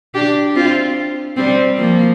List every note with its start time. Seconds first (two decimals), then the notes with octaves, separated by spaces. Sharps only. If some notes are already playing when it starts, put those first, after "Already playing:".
0.15 D4 G4
0.56 C4 F4
1.37 G3 C4
1.78 F3 A#3